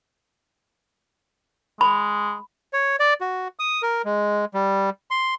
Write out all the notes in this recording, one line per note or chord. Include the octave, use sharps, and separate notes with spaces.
G#3 B5
C#5
D5
F#4
D#6
A#4
G#3
G3
C6